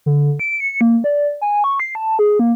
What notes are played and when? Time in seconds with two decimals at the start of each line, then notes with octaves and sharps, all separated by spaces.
0.06 D3
0.39 D7
0.60 C#7
0.81 A#3
1.04 D5
1.41 G#5
1.64 C#6
1.80 C7
1.95 A5
2.19 G#4
2.39 A#3